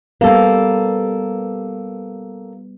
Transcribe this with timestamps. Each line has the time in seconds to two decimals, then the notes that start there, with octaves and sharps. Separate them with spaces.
0.21 G3 A#3 B3 A4